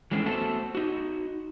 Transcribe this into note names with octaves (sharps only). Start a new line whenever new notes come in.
E3 G#3 A3 C4 C#4
A3 B3 F#4 A4 C5 A5
D#4 F#4